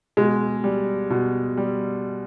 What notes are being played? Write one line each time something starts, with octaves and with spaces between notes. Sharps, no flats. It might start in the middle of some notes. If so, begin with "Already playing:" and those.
B2 G#3
G3
B2
G3